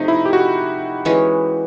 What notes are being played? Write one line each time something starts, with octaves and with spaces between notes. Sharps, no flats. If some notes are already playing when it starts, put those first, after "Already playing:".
Already playing: C3 F3 A3 C4 D#4
E4
G4
F#4
E3 G#3 C#4